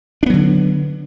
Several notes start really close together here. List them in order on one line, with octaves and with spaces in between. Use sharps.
D4 B3 F#3 D3